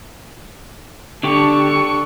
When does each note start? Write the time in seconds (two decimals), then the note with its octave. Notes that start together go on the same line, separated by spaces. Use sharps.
1.23 D3 D4 G4 A4 C#6